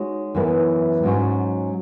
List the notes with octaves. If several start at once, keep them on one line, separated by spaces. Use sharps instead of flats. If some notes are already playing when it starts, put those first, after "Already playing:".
Already playing: G#3 D#4 F#4 C#5
F#2 E3 B3 E4 B4
G#2 F#3 C#4 F#4